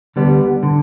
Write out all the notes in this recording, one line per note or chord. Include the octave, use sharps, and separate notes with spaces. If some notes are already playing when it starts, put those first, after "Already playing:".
D2 D3 G3 B3
D3